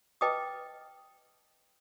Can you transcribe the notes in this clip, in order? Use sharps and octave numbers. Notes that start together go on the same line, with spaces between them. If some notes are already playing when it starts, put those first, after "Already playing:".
B4 D#5 G5 A5 D6 D#6